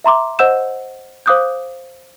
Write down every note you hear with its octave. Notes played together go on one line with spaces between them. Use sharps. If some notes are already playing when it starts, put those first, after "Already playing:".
E5 A#5 C6 D6
C5 D#5 F#5 E6 G6 E7
C5 F5 D6 D#6 F#6 G6